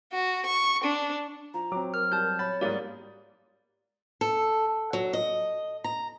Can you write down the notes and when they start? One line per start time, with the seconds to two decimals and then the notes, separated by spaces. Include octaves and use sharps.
0.13 F#4
0.46 C#6
0.84 D4
1.54 F3 A#5
1.72 F#3 C4 D6
1.94 A#4 F6
2.12 G3 A5 G6
2.39 C#5 B5 A6
2.61 G#2 G3 A#3 D5 D#6
4.21 A4
4.93 F#3
5.13 D#5
5.84 A#5